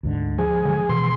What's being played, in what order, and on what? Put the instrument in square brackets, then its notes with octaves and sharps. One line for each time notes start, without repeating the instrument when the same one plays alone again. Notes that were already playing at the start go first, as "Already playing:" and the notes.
[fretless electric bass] D2 G#2 D3
[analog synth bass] F3 [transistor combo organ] G#4
[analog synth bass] D3 [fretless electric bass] F3 G#3
[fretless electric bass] B2 [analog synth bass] E3 [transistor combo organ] C6